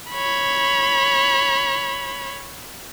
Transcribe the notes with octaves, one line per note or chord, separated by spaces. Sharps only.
C#5 B5